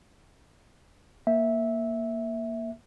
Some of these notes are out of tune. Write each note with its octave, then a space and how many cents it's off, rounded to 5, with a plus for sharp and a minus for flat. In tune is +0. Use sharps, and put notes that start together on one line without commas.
A#3 +5 E5 -10